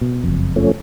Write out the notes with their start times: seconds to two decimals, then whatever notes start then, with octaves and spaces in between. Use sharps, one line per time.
0.01 B2
0.24 F#1 F2
0.56 F3 A3 C#4